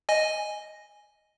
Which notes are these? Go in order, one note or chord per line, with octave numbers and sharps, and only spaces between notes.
D#5 G#5